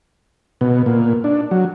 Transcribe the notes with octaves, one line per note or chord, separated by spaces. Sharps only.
B2
A#2
D4
F#3